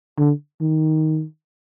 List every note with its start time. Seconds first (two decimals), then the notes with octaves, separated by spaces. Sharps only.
0.18 D3
0.61 D#3